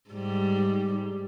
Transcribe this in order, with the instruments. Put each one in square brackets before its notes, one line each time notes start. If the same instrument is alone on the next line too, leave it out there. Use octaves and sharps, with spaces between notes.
[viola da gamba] G#2 G3